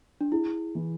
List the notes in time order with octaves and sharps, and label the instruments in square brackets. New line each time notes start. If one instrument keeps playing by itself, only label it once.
[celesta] D4
[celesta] E4 [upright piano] G#4
[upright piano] E3